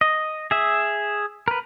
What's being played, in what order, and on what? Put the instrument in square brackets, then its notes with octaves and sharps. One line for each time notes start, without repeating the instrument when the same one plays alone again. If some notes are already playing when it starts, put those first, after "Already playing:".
[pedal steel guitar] D#5
G#4 E5
A#4 B4